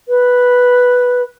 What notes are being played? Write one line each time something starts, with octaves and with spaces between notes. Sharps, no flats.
B4